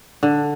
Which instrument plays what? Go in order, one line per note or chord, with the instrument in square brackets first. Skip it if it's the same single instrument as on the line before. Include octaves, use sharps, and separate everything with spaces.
[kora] D3